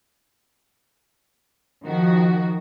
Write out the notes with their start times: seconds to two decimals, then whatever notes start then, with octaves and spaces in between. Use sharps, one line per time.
1.85 D#3 F3 F#4